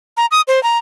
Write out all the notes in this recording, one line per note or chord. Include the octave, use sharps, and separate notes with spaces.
A#5
D#6
C5
A#5